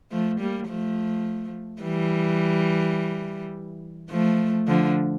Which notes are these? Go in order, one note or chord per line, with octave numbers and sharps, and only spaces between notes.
F3 A3
G3 A#3
F3 A3
E3 G3
F3 A3
D3 F3